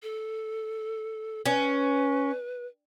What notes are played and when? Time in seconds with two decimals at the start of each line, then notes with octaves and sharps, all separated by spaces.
0.03 A4
1.46 C#4 B4